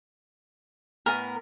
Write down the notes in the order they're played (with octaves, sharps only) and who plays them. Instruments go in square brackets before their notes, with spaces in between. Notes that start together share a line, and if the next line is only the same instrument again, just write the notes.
[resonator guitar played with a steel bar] A2 B3 G#5 [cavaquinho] A#4